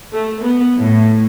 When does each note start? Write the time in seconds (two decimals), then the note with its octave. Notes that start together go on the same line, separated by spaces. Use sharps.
0.13 A3
0.42 B3
0.78 A2